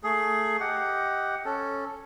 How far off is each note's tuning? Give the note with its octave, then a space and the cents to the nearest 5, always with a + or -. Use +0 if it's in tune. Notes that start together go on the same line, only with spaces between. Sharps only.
A3 +20 G#4 +20
G4 +0 D#5 +20 F#5 +5
C#4 -5 A4 +0